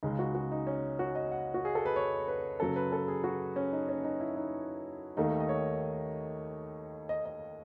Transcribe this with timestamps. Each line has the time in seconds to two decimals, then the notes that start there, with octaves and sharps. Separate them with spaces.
0.03 C#2 C#3 G#3 D#4
0.19 F#4
0.35 F#4
0.51 D#4
0.67 C#4
0.99 F#4
1.15 D#5
1.32 F#5
1.54 F#4
1.65 G#4
1.75 A4
1.85 B4
1.96 C#5
2.28 B4
2.60 F#2 C#3 F#3 A4
2.76 B4
2.92 A4
3.08 G#4
3.24 F#4
3.56 C#4
3.73 D#4
3.89 C#4
4.04 D#4
4.20 E4
4.36 D#4
5.17 D#2 D#3 A3 D#4
5.40 D#5
5.49 C#5
7.09 D#5
7.26 D#5